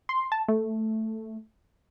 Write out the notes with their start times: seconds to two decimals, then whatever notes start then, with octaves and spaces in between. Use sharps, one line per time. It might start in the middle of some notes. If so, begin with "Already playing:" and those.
0.09 C6
0.32 A5
0.48 A3